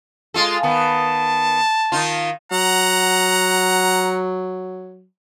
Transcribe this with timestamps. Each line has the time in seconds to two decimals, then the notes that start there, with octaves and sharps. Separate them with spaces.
0.34 G#3 F4 A4
0.63 D#3 B3 A5
1.92 D#3 D#4 F4
2.51 F#3 F#5 A#5